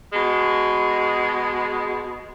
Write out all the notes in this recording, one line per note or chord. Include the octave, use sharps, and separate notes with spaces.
B2 G#3